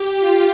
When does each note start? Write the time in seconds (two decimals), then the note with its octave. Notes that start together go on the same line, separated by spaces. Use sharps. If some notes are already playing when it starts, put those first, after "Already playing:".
Already playing: G4
0.20 F4